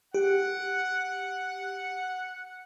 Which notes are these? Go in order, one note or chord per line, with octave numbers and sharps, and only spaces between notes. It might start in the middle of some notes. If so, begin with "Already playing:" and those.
G4 F#5